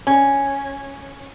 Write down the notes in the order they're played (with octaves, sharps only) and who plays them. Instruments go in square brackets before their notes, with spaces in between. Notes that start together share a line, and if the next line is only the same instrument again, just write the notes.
[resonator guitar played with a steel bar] C#4